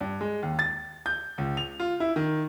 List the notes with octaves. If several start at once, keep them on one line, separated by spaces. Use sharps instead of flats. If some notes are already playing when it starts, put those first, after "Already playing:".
G2
G#3
D#2
A6
G6
C#2
F7
F4
E4
D#3